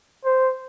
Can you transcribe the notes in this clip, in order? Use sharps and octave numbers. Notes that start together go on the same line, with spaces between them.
C5